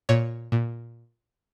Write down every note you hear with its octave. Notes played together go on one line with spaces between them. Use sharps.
A#2 C#5
A#2